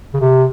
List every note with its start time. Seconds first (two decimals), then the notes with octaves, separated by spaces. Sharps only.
0.14 C#3
0.20 C3